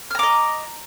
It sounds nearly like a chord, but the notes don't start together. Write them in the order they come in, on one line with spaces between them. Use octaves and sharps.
F6 A#5 D6 D#5